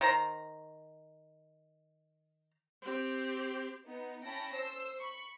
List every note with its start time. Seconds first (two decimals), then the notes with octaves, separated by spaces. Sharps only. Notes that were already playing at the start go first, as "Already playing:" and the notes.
0.01 D#3 C5 A#5
2.82 C4 G4
3.86 B3 D#4
4.24 C#4 E4 G5 A5 B5 A#6
4.53 C5 E6
4.98 B5 C#6